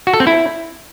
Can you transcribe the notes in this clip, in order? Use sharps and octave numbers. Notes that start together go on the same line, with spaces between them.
F#4
A4
C4
E4